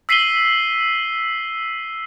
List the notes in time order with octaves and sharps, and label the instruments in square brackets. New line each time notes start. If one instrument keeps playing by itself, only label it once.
[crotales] E6 B6 C7 D#7 F#7 G7